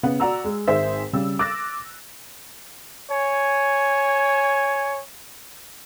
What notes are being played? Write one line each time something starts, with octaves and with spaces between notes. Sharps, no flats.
C#3 B3 F#5
F#4 D5 F#5 A#5 E6
G#3
G#1 D#3 G#4 C5 E5
C#3 G3 E6
D6 E6 F#6 A6 A#6
C#5 G#5